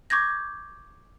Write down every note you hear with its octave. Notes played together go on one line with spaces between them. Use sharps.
C#6 D6 G6 G#6 A#6